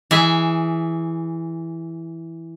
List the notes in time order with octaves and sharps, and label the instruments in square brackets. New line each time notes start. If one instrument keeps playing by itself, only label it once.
[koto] E3 G#4 E5